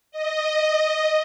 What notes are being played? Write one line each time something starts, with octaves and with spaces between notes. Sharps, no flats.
D#5